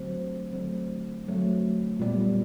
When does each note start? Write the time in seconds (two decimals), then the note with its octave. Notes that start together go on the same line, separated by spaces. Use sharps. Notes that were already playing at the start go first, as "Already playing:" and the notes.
Already playing: D3 F#3 A3 C4
0.53 D3 F#3 A3 C4
1.26 D3 F#3 A3 C4
1.99 A#2 G3 B3